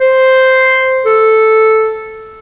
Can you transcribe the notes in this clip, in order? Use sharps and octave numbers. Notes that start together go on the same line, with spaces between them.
C5
A4